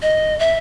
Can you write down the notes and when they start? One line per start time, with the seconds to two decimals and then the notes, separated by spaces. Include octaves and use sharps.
0.02 D#5
0.39 E5